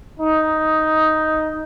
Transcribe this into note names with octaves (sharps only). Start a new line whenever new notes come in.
D#4